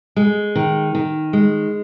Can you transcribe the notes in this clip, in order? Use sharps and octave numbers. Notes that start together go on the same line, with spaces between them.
G#3
D#3
D#3
G#3